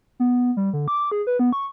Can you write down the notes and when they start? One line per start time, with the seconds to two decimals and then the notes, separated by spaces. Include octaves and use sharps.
0.20 B3
0.57 G3
0.73 D3
0.88 D6
1.12 G#4
1.27 B4
1.39 B3
1.53 C#6